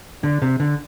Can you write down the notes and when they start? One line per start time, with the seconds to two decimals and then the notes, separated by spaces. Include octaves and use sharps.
0.23 D3
0.42 C3
0.60 D3